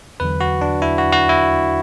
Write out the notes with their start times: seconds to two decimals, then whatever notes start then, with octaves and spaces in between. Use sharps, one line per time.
0.20 E2 D3 F#3 B4
0.41 F#4
0.61 D4
0.82 E4
0.98 F#4
1.12 F#4
1.29 E4